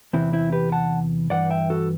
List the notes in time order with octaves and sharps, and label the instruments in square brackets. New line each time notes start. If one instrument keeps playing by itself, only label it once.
[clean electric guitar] E2 C3 E3 C4 E4
C4 E4
G4 B4
F#5 A5
G2 E3 D5 F#5
E5 G5
F#4 A4